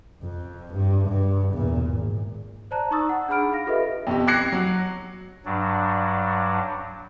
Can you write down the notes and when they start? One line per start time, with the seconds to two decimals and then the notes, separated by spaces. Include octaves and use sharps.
0.23 F2
0.74 G2
1.08 G2
1.53 E2 A#2
1.85 G#1
2.71 C5 D5 A5 A#5 F#6
2.91 D#4 A#5 C#6 D#6 E6 A6
3.09 F#5
3.28 D4 G#4 F#5 B5 F6 D7
3.52 F5 B5 A#6
3.66 F4 G4 A4 B4 D#5 E5
4.07 F2 B2 G4
4.27 D6 F#6 G#6 A#6 C7 C#7
4.52 F#3
5.45 G2 F#3 D4